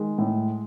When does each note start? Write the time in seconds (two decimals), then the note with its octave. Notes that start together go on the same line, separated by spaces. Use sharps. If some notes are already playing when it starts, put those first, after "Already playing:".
Already playing: D#3 G#3
0.18 A2